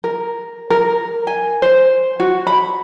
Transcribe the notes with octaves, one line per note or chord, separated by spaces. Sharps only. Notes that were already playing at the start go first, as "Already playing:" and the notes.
A#4
A#4
G#5
C5
F#4
B5